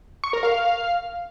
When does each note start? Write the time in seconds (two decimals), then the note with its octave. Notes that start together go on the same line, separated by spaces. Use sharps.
0.24 C#6
0.33 A#4
0.43 F5